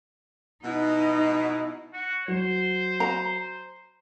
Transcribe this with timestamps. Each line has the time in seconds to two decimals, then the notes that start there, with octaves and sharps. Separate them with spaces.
0.64 B2 D#4 E4
1.93 F#4
2.28 F#3 C5
3.00 A#5